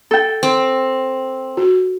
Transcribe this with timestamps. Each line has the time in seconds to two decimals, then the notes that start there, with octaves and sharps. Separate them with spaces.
0.11 A4 G5
0.43 C4
1.57 F#4